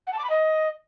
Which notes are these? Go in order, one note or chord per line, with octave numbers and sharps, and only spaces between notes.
F#5
A5
D6
B5
D#5